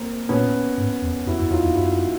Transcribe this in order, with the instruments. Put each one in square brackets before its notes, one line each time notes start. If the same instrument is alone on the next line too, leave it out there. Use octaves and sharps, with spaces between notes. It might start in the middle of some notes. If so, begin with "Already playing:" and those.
Already playing: [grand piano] A#3 C4
[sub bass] A#2 [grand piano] B3 C#4
[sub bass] G#2
E2
[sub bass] F2 [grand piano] E4 F#4
[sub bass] F#2
[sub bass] E2 [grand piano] D#4 F4
[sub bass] E2
[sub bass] F#2 [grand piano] E4 F#4